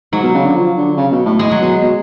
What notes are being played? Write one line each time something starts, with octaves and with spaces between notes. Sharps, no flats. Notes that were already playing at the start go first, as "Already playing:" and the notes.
G#2 F#3
B2
C#3
D3
F3
D3
C#3
B2
A2
A2 G#3
F#3
B2 G#3
B2